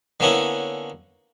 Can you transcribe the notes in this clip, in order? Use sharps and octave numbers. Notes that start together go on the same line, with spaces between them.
D3 A#3 B3 C#4 D4 E4